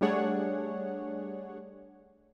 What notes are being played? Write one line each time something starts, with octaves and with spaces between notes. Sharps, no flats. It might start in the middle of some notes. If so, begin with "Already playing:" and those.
G3 A3 D4 G#4 C#5 F#5